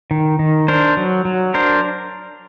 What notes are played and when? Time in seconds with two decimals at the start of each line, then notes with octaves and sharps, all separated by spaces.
0.11 D#3
0.39 D#3
0.68 D4 A#4 C5
0.97 F#3
1.25 F#3
1.54 D4 A#4 C5